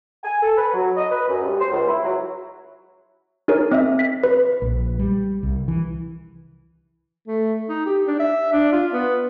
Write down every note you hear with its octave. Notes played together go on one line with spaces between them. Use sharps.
G#5
A4
B4
F#3
D#5
B4
F#2
G2
C5
C#2
E4
F#3
D#4 G#4 A#4 C#5
C4 D#5 E5
B6
B4
A#1
G3
C2
E3
A3
D#4
G4
D4
E5
D4
F4
B3